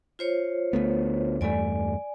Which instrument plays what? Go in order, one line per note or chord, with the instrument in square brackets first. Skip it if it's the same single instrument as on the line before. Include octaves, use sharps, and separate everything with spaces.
[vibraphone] F4 C5 C#5
[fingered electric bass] D2 A3 B3
[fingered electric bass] E2 G2 A3 [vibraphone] D5 G#5